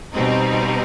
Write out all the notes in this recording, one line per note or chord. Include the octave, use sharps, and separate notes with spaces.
B2 G3 C4 D#4